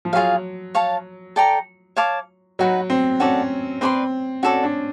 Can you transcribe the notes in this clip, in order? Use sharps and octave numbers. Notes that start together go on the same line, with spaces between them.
F3
F#3 F4 G#4 C#5 F5
C#5 F5 A5
A4 D5 G5 A#5
C#5 F5 A5 D6
F#3 D#4 F#4 B4
C4
C#4 F#4 A4 D5
C4 B4 D5 G5 C6
C#4 F#4 A4 D5
D4